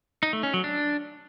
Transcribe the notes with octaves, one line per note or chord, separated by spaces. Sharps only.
D#4
A3
C#4
F#3
D4